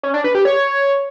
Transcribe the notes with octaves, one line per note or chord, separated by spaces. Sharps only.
C#4
D4
B4
G4
C#5